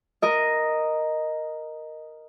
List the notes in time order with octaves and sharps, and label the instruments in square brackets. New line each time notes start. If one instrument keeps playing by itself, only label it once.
[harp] A#4 D#5